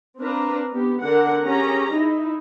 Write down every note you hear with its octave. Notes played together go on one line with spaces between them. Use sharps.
C4 D4 B4 F5 A#5
B3 G4
D3 D4 A#4 F#5
C#4 G4 G#4 A#5
D#4 E4